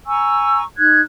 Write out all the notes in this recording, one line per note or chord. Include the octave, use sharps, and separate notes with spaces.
G#5 A#5 C#6 E6
D#4 F#6 G#6